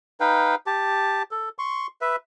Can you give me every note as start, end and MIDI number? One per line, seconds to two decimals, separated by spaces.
0.20 0.55 63
0.20 0.55 71
0.20 0.55 77
0.20 0.55 79
0.66 1.23 67
0.66 1.23 81
1.31 1.49 69
1.59 1.87 84
1.59 1.87 85
2.01 2.16 71
2.01 2.16 76